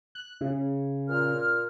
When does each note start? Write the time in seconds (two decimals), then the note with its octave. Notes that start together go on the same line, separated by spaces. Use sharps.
0.15 F#6
0.41 C#3
1.09 A#2 F6